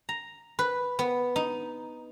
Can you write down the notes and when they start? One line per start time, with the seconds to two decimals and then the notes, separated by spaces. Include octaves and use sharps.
0.09 A#5
0.59 B4
0.99 B3
1.36 D#4